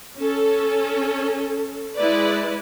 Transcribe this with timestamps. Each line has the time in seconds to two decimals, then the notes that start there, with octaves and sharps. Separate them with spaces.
0.18 C#4 A4
1.97 G#3 E4 B4 D5